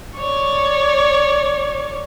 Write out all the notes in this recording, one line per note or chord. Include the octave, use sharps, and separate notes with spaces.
C#5 D5